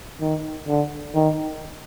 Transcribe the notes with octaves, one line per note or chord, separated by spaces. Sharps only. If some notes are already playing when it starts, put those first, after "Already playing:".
D#3
D3
D#3